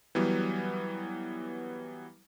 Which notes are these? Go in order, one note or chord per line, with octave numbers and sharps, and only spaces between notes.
E3 F#3 G3 B3